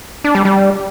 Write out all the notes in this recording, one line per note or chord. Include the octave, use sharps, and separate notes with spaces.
D4
G3
G3